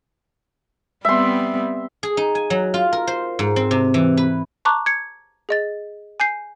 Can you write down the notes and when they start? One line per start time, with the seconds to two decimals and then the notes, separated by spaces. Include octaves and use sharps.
1.05 G3 B3 C4 E5 C6
2.03 G#4
2.17 D#4
2.35 G#5
2.50 F#3
2.74 F4
2.92 A#4
3.07 C5
3.39 G#2
3.56 C4
3.71 C3
3.94 E3
4.17 B4
4.65 A5 A#5 C#6 D6 F#6
4.86 G#6 C#7
5.49 G#4 D#5 A6
6.20 G#5 G6 C7